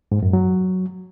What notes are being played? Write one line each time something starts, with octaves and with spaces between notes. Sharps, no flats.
G#2
F#2
F#3